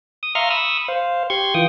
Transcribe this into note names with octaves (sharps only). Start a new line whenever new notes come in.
D#6
E5 F5 A#5 C6 C#6 F6
B5 C#6 D#6 E6
C5 F5
G4 C6 C#6 G#6
E3 F4 G5 D#6